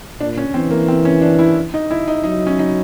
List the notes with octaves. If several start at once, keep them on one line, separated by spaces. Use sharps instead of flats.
A#2 D4
C#4
E3 C4
A#3
C4
C#4
D4
E4
D#4
E4
D#4
F#3 D#4
C#4
D#4